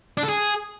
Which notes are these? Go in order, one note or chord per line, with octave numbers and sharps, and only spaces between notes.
D4
A4
G#4